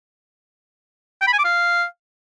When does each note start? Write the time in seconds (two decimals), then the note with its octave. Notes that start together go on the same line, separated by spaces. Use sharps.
1.22 G5
1.27 B5
1.33 G#5
1.39 D6
1.44 F5